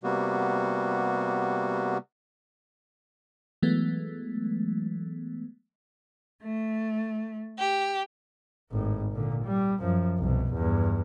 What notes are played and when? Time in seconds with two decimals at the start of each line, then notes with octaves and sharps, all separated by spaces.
0.04 C3 G3 A#3 B3 F#4
3.62 E3 F#3 G#3 A3 B3
6.43 A3
7.59 G4
8.72 G#1 A2
9.13 A#2 D3
9.44 G3
9.81 F#2 F3
10.19 C2 B2
10.54 E2 G2